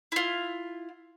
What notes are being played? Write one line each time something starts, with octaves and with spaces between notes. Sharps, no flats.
E4 F4